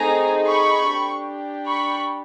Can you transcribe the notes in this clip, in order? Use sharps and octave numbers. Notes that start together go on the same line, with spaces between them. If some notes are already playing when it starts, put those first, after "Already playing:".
Already playing: A3 C4 D#4 G#4 G#5 A#5
B5 C#6
D4 G4
B5 C#6